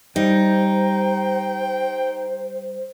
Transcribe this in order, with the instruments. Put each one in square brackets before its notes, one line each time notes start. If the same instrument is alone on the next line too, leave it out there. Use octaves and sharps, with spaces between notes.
[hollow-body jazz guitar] G3 [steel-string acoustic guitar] D#4 [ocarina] C5 [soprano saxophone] G5